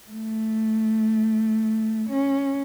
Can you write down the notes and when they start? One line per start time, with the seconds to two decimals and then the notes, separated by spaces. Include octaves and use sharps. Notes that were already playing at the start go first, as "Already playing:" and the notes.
0.11 A3
2.09 C#4